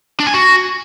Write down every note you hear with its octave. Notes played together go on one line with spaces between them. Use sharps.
D4
G#5
F#4